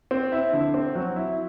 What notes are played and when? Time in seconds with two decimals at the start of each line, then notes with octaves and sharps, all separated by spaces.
0.11 C4
0.32 E4
0.53 D3
0.74 C4
0.95 F#3
1.16 E4